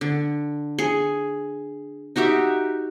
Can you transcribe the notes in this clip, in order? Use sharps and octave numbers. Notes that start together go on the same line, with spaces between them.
D3
G#4
D#4 F#4 G4 E5